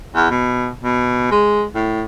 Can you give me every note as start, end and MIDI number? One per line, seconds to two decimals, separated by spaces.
0.16 0.29 40
0.30 0.71 47
0.83 1.28 47
1.31 1.64 56
1.75 2.04 45